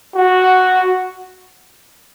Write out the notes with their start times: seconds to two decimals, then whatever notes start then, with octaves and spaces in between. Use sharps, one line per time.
0.15 F#4